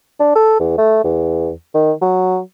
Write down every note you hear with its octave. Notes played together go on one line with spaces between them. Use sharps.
D4
A4
E2
A3
E2
D#3
F#3